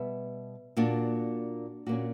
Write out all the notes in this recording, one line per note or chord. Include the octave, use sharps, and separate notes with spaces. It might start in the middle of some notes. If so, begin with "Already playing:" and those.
Already playing: B2 G3 B3 E5
A#2 A#3 D4 F#4
A#2 A#3 C#4 F#4